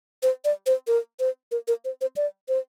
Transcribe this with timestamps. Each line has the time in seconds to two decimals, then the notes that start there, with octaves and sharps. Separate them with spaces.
0.23 C5
0.45 D5
0.66 C5
0.87 A#4
1.20 C5
1.52 A#4
1.68 A#4
1.85 C5
2.01 C5
2.16 D5
2.49 C5